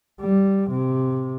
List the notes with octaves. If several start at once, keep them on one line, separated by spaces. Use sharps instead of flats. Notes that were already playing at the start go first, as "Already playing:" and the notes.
G3
C3